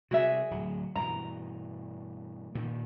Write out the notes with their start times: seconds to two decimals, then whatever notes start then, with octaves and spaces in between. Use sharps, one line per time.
0.11 C3 G3 F#4 G#4 E5
0.51 D1 F#3
0.96 G2 B2 E3 A#5
2.55 G2 A#2 D#3